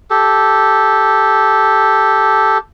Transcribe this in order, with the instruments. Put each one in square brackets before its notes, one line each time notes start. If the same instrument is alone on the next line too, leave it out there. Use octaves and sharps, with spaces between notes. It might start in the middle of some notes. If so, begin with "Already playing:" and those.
[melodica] G4 A4